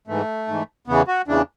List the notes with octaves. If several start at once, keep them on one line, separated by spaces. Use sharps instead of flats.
G#2 E3 A3
G#2 E3
E2 C#3 E3 B3
F#4
E2 C#3 E3 D4